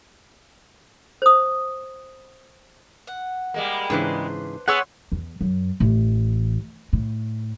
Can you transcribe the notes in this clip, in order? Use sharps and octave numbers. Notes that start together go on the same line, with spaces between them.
C5 D#6
F#5
G3 G#3 A#3
G#2 C#3 E3 D4 B4 C5
B3 G#4 C#5 F#5 C6 E6
E2
F#2
A1
A2